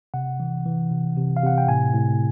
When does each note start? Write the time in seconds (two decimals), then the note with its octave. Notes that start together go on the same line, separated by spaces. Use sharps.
0.14 C3 F#5
0.40 E3
0.66 E3
0.91 C3
1.17 C3
1.37 F5
1.43 C3 F#5
1.58 G5
1.68 A2 G#5
1.94 A2